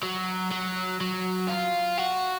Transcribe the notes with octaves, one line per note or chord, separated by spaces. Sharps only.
F#3
F#3
F#3
F4
F#4